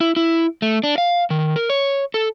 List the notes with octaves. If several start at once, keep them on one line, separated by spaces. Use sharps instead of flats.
E4
E4
A3
D4
F5
D#3
A#4
C#5
A4